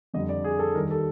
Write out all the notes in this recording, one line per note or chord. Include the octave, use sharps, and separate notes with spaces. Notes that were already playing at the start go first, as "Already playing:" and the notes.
F2 D3 G3 D#5
D5
G#4
A4
D#2 D#3 G3 A#4
A4